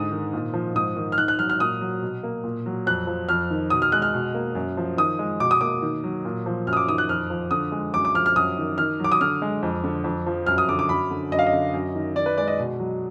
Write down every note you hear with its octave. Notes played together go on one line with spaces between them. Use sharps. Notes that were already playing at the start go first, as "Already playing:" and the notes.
Already playing: G#2 D3 G#3 D#6
D#3
A#2
F3
G#2 D#6
D#3
F6
D#3 F#6
F#6
F#3 F6
F6
A#2 D#6
F#3
B2
A#3
A#2
F#3
F2 F#6
F3
F2 F6
D#3
B2 D#6
F6
G#3 F#6
F6
B2
A#3
F#2
F3
D#3 D#6
G#3
B2 D6
D#6
A#3 D6
D#3
F#3
A#2
F3
F#2 F6
D#6
D6
D#3 D#6
F#6
F2 F6
F3
D3 D#6
G#3
F#2 D6
D6
F3 F6
F6
F#2 D#6
D#3
D#3 F6
F#3 D6
D#6
D3 F6
G#3
F2
D3
F2
F3
F#2 F6
D#6
D3 D6
D6
F#2 B5
D3
F#2 D#5
F5
D#5
D3
F#2
D#3
D#3 D5
B4
G#3 D5
D#5
B2
F#3